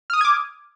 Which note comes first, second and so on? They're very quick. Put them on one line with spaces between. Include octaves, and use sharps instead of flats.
F6 D#6 D#7 G#6 D6